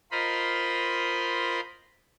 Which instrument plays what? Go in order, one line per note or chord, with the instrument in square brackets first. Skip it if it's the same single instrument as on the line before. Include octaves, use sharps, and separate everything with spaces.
[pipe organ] F4 A#4 C5 D#5 B5 C6